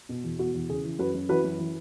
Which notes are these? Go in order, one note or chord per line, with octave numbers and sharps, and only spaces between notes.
B2
E2
B2 F#4
E2
C#3 G#4
E3
F#2 F#4 B4
F#2
E3 F#4 B4
F#2
E3